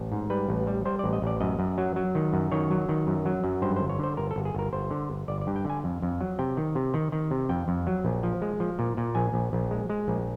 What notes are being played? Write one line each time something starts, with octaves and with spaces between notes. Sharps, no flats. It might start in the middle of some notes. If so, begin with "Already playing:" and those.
Already playing: A1
G#2
G3 B4
A1
G3
G3 C5
D5
A1
D#5
A1 D5
F#2 D#5
F#2
F#3
F#3
D#3
F#2
D#3 C#5
F#3
D#3
F#2
F#3
F#2
G2 C5
G1 C5
C#5
D3 C5
G1 A#4
A4
G1
G#4
G1 A#4
G1 C5
D3
G1
G1 D5
D5
G2
G5
D3 G#5
F2
F2
F#3
C3 G5
D#3
C3
D#3
D#3
C3
F2 G5
F2
F#3
A#1
F3
G#3
F3
A#2
A#2
A#1 G#5
A#1
A#1
G#3
G#3
A#1